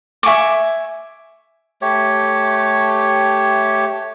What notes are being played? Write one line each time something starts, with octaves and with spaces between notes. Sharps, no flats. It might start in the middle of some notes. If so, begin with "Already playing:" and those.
E5 G#5 C#6 D6
A3 G4 C#5